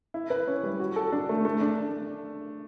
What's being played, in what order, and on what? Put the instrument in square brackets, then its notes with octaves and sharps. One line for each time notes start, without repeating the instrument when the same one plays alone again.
[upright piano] E4
B4
C#4
G3
F#4
A4
D4
A3
A3
D4